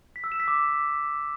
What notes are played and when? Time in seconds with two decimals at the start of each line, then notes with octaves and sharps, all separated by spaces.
0.16 B6
0.24 E6
0.32 E7
0.40 B6
0.48 D6